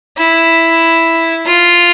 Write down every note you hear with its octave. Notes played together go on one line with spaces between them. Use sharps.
E4
F4